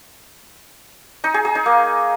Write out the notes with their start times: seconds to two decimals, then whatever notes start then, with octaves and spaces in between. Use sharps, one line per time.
1.24 D#4
1.34 G#4
1.45 G#4
1.55 D#4
1.66 A#3